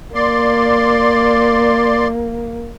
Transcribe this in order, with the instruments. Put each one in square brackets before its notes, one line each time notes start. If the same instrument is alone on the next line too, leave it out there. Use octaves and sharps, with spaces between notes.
[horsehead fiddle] A#3 [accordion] D5 C6